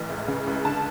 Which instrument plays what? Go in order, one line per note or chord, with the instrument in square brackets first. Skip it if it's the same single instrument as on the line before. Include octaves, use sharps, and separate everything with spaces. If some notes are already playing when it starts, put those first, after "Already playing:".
Already playing: [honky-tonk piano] A1 E3
C#2
C#3
C#2
D3 A5